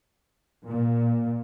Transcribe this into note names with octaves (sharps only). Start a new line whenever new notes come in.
A#2